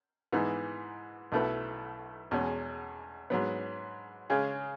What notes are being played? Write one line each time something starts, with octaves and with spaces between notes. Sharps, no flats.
G#2 E3 B3 D#4
B1 B2 A3 E4 B4
E2 B2 G#3 C#4
G#2 F#3 B3
C#3 G#3 C#4 G#4